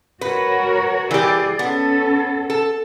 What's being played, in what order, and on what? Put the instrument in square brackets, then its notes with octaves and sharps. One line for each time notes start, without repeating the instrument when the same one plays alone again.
[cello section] F#4 A#4 C#5 [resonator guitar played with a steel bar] B4
[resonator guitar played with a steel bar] E3 G4 [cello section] G#4 D5
[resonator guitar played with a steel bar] B3 [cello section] C#4 A4
[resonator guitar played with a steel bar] A4